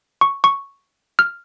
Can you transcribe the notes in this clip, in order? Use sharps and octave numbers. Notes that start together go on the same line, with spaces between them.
C#6
C#6
F6